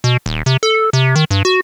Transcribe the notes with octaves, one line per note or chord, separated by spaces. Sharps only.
B2
D#1
C3
A4
C3
D#3
G2
F#4